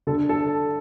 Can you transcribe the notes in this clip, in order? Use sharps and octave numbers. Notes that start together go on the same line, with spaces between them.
D3 A4
A4